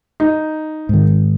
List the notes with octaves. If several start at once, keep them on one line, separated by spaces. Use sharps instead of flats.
D#4
G#2 D#3